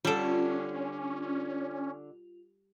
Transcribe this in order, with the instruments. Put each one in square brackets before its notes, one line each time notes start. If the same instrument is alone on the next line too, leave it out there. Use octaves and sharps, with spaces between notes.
[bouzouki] D3 D4 [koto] G3 A4 [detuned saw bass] C#4 [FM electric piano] F4